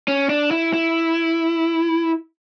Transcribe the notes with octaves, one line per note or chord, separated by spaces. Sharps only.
C#4
D4
E4
E4